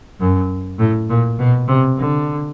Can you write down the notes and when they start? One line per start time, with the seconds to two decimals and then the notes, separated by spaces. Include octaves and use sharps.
0.20 F#2
0.79 A2
1.09 A#2
1.39 B2
1.68 C3
1.97 D3